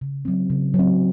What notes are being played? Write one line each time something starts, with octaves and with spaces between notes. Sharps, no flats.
C#3
F#3 C4
C#3
F#3
C4